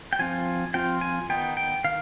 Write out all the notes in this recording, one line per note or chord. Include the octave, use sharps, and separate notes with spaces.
G5
F3 C4 F4 G#5
F3 C4 F4 G5
G#5
D#3 B3 D#4 G5
G5
D#3 F5